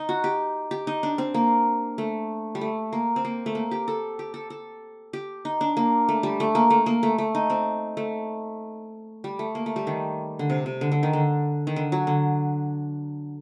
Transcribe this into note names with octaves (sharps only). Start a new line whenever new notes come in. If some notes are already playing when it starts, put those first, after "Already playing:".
Already playing: D#4
F#4
G4
G4
D#4
D4
C4
A#3
A3
G3
A3
A#3
C4
A#3
A3
A#3
G4
A4
G4
A4
A4
G4
D#4
D4
A#3
A3
G3
A3
A#3
A3
A#3
A3
A3
D#4
C4
A3
G3
A3
A#3
A3
G3
D#3
D3
C3
C3
D3
D3
D#3
D3
D#3
D3
F#3
D3